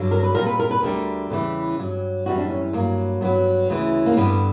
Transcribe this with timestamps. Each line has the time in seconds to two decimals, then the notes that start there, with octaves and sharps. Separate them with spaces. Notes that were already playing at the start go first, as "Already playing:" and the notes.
Already playing: G2 D3 F#3
0.11 A#4
0.23 B4
0.35 A#2 G3 A#4
0.47 B4
0.60 A#4
0.71 B4
0.83 D2 D3 G3 A#4
1.30 E2 C#3 E3 G3 G4
1.79 G2 F#3
2.26 F#2 E3 G3 F#4
2.38 D4
2.50 C#4
2.73 G2 F#3 A#3
3.21 G2 F#3 B3
3.70 D2 C#3 E3
4.06 A#3
4.17 G2 D3 G3 B3